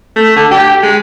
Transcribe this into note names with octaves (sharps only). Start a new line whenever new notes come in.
A3
D3
G4
G#3